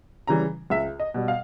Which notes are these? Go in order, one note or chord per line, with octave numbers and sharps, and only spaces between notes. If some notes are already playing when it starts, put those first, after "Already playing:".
C#3 E3 G3 A#5
C#2 E5
D#5
B2 G3
F5